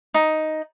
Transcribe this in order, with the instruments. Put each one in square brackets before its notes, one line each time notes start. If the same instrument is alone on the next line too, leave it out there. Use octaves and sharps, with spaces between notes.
[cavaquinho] D#4